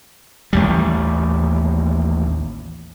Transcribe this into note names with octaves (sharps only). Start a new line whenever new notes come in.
A1 D#2 G3